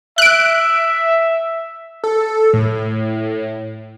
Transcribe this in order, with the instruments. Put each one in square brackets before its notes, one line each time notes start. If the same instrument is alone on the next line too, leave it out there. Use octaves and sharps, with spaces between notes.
[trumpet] E5 [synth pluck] F#6 D7
[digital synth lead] A4
A2